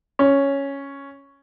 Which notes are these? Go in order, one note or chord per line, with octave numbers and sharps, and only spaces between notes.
C#4